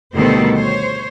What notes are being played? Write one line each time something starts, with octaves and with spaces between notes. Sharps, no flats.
D2 B2 D#3 G3 A4 C5
C5 C#5